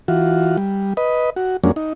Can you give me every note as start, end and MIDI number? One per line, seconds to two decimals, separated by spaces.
0.08 0.56 52
0.08 0.56 65
0.08 0.56 66
0.57 0.94 55
0.97 1.30 71
0.97 1.30 75
1.36 1.57 66
1.64 1.71 41
1.64 1.71 54
1.64 1.71 56
1.64 1.71 58
1.64 1.71 61
1.64 1.71 62
1.76 1.93 63